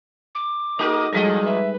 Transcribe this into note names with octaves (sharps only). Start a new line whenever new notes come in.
D6
A3 D#4 F#4 G#4 A#4 D#5
A#2 F3 G3 G#3 G#4 A4 D#5
B4 E5